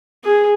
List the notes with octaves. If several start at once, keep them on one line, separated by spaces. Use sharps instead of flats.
G#4